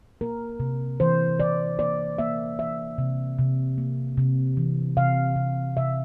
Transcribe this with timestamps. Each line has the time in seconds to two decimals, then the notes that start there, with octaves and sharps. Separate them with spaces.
0.21 A#3 A#4
0.60 C3
1.00 E3 C5
1.40 E3 D5
1.79 A#3 D5
2.18 A#3 E5
2.59 E3 E5
2.98 C3
3.38 C3
3.78 A#3
4.17 C3
4.57 E3
4.97 C3 F5
5.36 C3
5.77 C3 E5